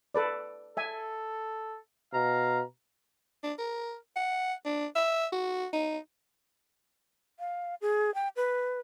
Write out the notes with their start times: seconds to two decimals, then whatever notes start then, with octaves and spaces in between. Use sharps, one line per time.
0.15 A4 B4 D5
0.77 A4 E5 G#5
2.14 B2 F5 A#5
3.43 D4
3.59 A#4
4.16 F#5
4.65 D4
4.95 E5
5.33 F#4
5.73 D#4
7.39 F5
7.82 G#4
8.15 G5
8.36 B4